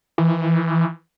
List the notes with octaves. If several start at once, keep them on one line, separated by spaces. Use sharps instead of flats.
E3